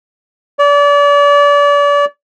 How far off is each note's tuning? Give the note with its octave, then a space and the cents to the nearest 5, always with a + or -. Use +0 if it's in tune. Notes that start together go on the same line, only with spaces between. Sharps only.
D5 -35